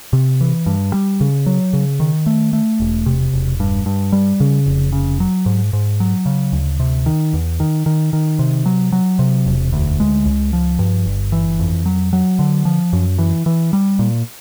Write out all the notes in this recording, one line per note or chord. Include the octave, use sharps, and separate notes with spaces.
C3
E3
G2
G3
C#3
F#3
C#3
D#3
A3
A3
E1
C3
E1
G2
G2
G3
C#3
F1
C#3
F#3
G#2
G#2
F#3
C#3
D2
C3
D#3
E2
D#3
D#3
D#3
C3
F#3
F#3
C3
E1
D2
G#3
C#2
F3
G2
G1
E3
F2
F#3
F#3
D3
F3
F#2
E3
E3
G3
A#2